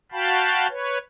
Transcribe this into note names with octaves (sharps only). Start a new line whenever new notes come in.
F#4 F5 G5 A5 B5
B4 C#5